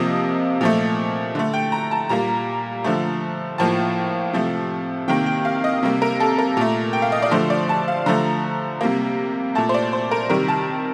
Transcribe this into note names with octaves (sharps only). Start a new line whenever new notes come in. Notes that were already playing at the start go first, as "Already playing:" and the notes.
Already playing: C3 F3 A#3 D#5
A#2 F3 A3
D3 A3
G5
A#5
A5
A#2 G3 A#3 A#5
D3 F3 A3
A2 F3 A#3 A5
C3 F3 A3
C3 D#3 A#3 G5
G5
F5
D#5
C3 G3 A#3
A#4
A4
A#4
A#2 A3
G5
F5
D#5
D5
D3 F3 A3 C5
D5
A5
F5
D3 F3 A3 A#5
C3 G3 A#3
A#2 A3 A5
C5
D5
C5
A#4
C3 D#3 G3 A#4
A5